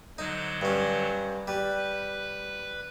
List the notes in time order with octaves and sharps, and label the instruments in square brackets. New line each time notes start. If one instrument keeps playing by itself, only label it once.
[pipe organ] D3 F#3 C5 [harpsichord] D#4
[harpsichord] G2 C#4
[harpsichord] G3 [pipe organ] B4